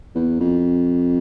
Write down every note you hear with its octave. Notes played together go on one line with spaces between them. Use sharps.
E2
F2